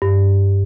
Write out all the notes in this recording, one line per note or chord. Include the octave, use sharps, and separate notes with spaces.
G2